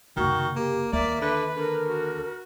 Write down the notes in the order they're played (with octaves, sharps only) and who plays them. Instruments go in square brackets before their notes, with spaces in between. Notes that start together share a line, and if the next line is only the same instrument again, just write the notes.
[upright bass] F#1 C3 [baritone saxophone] D#3 [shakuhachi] F#4
[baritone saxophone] A#3 [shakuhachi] G4
[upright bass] D#2 [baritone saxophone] A#3 [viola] D5 [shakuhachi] E5
[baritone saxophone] D3 [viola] B4
[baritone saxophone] D3 [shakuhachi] A#4
[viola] F#4